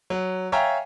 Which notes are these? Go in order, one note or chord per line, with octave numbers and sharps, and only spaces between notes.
F#3
C#5 E5 F5 G5 G#5 A#5